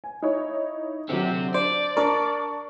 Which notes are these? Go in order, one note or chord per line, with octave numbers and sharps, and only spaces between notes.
G#5
D#4 E4 C#5
D3 F#3 C4 G4
D4 C5 D5
D4 A#4 A5 C#6